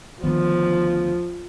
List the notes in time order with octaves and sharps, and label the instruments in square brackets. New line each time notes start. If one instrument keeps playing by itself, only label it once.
[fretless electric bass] D2 D#3 B3 [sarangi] F3